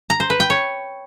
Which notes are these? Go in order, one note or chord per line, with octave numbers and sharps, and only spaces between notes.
A#5
C5
B4
G5
C#5